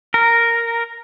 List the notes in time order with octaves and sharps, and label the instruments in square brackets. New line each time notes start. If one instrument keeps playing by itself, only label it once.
[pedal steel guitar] A#4